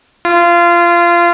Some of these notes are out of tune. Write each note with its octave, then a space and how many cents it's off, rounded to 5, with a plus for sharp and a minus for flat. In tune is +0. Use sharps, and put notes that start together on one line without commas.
F4 -20